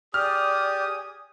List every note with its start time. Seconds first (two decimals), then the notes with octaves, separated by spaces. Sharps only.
0.14 G4 G#4 D5 G#5 D#6 F6